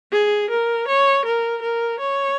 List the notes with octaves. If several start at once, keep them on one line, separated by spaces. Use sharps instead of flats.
G#4
A#4
C#5
A#4
A#4
C#5